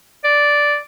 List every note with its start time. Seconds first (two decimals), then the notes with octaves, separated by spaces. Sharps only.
0.24 D5